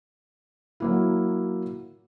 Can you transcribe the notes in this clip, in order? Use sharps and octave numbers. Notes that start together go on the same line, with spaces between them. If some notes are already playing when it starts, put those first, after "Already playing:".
F#3 A#3 E4